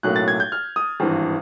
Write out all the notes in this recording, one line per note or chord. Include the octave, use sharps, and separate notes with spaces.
B1 A2 F#3 A#3 C#4 F#6
A6
G#6
G6
F6
D#6
G#1 G2 E3